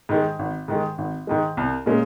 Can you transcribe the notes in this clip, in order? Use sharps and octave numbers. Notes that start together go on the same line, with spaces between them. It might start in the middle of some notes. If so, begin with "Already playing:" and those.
G#2 D#3 G#3
G#1
G#2 D#3 G#3
G#1
G#2 D#3 G#3
C2
A#2 G#3 C#4